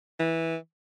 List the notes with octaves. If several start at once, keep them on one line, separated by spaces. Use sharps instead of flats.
E3